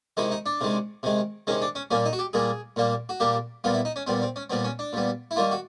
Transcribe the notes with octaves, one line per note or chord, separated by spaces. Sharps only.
C3 D#3 G#3 E4
D#4
D4
C3 D#3 G#3
C3 D#3 G#3
C3 D#3 G#3 C#4
D4
C#4
A#2 G3 A#3 C#4
D#4
F#4
G4
A#2 G3 A#3 G#4
A#2 G3 A#3
F#4
A#2 G3 A#3 G4
A#2 G3 B3 F4
E4
D#4
C#4
A#2 G3 B3 C4
C4
C#4
A#2 G3 B3 C4
C#4
D4
A#2 G3 B3
E4
D#3 G3 A#3 F4
F#4